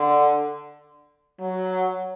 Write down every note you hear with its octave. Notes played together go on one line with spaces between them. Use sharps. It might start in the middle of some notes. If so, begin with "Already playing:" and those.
Already playing: D3
F#3